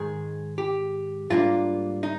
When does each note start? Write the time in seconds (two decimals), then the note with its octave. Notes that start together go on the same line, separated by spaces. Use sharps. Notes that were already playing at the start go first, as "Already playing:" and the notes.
Already playing: G#2 D#3 G#3 G#4
0.58 G4
1.30 G#2 G3 A#3 D4 F4
2.03 D#4